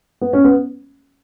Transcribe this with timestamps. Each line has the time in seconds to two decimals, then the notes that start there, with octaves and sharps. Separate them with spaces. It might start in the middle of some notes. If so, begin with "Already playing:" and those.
0.21 B3
0.33 C#4
0.44 B3